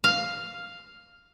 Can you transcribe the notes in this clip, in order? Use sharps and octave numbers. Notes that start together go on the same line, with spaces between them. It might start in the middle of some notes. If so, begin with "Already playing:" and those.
F5